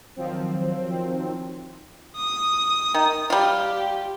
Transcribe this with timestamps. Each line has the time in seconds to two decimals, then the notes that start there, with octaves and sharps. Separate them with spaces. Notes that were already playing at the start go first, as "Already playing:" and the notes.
0.16 D#3 F3 F#3 C4
2.16 D#6
2.94 D#3
3.30 G3 F4 G4